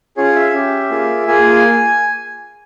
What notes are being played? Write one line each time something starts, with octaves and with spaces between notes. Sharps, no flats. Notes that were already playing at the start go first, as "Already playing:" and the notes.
C#4 F4 G#4 C#5
E5
C#4 G4
A#3 F4 G#4
A#3 F4 G#4 G#5